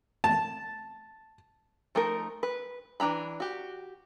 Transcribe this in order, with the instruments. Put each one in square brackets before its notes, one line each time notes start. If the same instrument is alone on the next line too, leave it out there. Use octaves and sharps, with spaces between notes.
[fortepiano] A5
[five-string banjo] F3 A3 D#4 A#4
B4
E3 F#3 D4 A#5 B5
F#4 G4